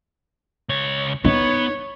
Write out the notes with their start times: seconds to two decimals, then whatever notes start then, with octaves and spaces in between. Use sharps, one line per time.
0.69 C#2 C#5
1.25 B3 D#4 C#5